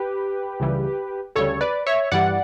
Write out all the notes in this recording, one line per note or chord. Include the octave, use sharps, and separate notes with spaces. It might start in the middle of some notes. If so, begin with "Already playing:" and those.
Already playing: G4 B4
C#2 C#3 E3 G3
D2 C#3 G3 A4 C#5
B4 D5
C#5 E5
G2 E3 G3 D5 F#5